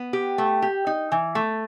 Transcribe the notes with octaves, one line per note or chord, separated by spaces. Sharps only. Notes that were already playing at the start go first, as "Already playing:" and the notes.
Already playing: B3
G4
A3
G4
D#4
E3
A3